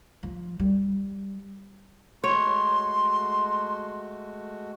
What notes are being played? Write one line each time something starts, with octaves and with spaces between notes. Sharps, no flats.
F3
G3
G#3 A3 F#4 C#5 C6